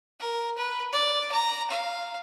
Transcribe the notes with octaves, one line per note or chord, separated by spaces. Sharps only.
A#4
B4
D5
A#5
F5